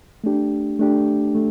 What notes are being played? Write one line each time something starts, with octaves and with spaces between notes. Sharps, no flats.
A3 D4 G4
A3 D4 G4
A3